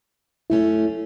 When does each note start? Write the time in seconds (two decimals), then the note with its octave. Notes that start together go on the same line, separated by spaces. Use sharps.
0.50 F#2 A3 C#4 E4